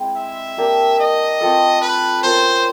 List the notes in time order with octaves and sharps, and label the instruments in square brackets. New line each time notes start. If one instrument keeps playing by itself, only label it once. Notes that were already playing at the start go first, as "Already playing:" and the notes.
Already playing: [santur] G#3 C4 E4
[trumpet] E5
[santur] A#3 D4 G4 A#4
[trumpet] D#5
[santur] A3 C4 F4 A4
[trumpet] B4
[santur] C#4 F4 A#4 C#5 [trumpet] C5